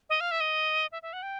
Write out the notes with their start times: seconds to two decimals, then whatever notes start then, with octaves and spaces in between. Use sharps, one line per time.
0.10 D#5
0.20 F5
0.31 E5
0.40 D#5
0.92 E5
1.02 E5
1.13 F#5
1.23 G5